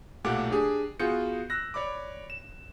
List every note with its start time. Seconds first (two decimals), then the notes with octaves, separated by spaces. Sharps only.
0.24 B1 A#2 A3 G4 F#5 D6
0.51 D4 G4 G#4
1.00 B3 F4 F#4 G#4 G6 C#7
1.50 E6 F#6 A#6
1.74 C#5 D5 B5 D6
2.30 E7